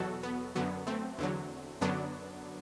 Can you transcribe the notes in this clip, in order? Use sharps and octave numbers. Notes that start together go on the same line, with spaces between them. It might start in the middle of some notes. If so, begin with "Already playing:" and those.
Already playing: E2 B2 F#3 F#4 A4
B3
F#2 D3 F#3 B3
A3 C4
E2 D3 F#3
F#2 D3 F#3 B3 D4